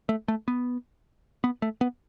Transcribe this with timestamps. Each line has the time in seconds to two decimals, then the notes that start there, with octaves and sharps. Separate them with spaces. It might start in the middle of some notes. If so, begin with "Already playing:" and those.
0.09 A3
0.28 A3
0.48 B3
1.44 B3
1.62 A3
1.81 B3